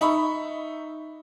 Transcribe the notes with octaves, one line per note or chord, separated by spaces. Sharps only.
D#4 E5 B5 C#6